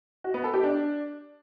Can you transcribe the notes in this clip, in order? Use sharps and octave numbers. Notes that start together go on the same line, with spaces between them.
F#4
B3
A4
G4
D4